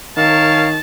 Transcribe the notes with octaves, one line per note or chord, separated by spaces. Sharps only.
D#3 A#4 C#5 F5 A5